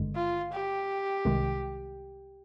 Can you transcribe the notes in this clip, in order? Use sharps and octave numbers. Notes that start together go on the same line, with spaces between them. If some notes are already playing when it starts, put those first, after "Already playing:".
Already playing: G#1 G2 D3 G#3
F4
G4
C2 C3 D#3 G#3